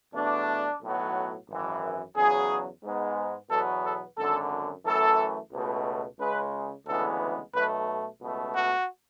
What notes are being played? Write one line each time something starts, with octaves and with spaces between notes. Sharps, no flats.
E2 B2 A3 D4
B1 A2 F#3 B3
G#1 F#2 E3
E2 C#3 F#3 G#4
G#2 G#3 B3
E2 B2 F#3 B3 A4
A4
G#1 F#2 D3 A4
F#2 E3 A3 A4
C#2 B2 A3
C#2 C#3 G#3 B4
D2 C#3 E3 G#3 B3 A4
B1 B2 A3 B4
C#2 B2 A3
F#4